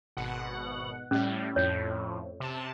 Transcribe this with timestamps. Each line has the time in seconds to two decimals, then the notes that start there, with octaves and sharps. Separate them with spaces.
0.17 G#1 B2 F#5
1.11 A2 G3 C#4
1.56 F2 A2 C#5
2.40 C3 A5